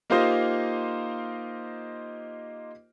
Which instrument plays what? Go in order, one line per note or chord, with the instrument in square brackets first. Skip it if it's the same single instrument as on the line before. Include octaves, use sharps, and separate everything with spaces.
[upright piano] A#3 D#4 F4 G4 C5 D#5